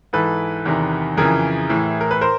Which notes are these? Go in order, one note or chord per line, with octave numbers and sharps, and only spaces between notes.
G#2 E3 A4 B4
E2 C3 D#3
F2 C#3 E3 G#4 A#4
A2 E3
A#4
B4
A#4 C5